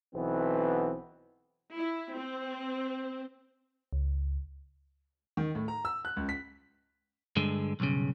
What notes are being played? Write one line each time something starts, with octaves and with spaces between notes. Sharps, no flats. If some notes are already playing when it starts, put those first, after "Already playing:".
B1 E3 B3 C4
E4
C4
C#2
D#3
A2
A#5
E6
F#6
C#2
B6
G2 D3 G#3
B1 G2 C#3